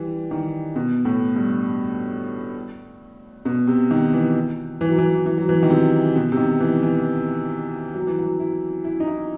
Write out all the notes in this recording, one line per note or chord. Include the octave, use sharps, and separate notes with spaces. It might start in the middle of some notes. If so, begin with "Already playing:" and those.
Already playing: E3 G3
D#3
B2
A2
G2
B2
C3
D#3
E3
E3
F#3
E3
E3
F#3
E3
D#3
C3
B2
C3
D#3
E3
E3
F#3
E3
F#3
E4
E4
D#4
E4